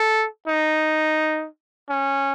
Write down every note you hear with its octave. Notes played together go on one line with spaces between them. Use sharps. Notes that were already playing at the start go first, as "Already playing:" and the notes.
Already playing: A4
D#4
C#4